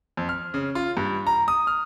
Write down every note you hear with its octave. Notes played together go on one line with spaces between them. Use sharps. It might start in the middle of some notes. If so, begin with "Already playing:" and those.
F2
F6
C#3
F4
G2
A#5
D#6
F6